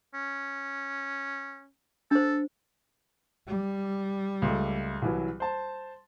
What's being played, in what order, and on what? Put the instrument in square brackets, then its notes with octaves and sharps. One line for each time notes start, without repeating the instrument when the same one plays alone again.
[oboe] C#4
[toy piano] D4 C5 [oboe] A4
[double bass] G3
[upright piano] C#2 A3
C2 E3 F#3
C5 A5